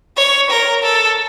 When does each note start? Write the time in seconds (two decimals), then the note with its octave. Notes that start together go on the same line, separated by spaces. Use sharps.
0.17 C#5
0.50 A#4
0.83 A4